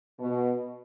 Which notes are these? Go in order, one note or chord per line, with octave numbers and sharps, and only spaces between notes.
B2